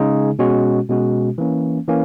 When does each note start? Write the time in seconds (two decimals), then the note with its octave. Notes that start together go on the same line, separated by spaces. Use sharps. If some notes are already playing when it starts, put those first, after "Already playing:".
Already playing: C#3 G#3 D#4 G#4
0.39 B2 G#3 C#4 F#4
0.89 B2 G#3 C#4 F#4
1.38 E3 A#3 C#4
1.88 E3 A#3 C#4